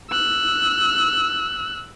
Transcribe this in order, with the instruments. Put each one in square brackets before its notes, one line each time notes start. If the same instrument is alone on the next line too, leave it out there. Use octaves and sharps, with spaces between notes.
[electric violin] E6 F#6